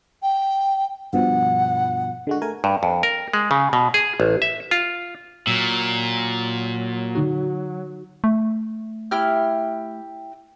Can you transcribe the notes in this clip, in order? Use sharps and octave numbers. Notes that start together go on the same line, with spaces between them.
G5
G2 B2 F3 F#5
D3 G#3 F#4
A3 A#4 G#5
G2
F2
A#4
G#3
C#3
B2
G#4
A1
E5
F4
A#2 F#3 E6
D3 D#4 F#4
A3
E4 G4 F6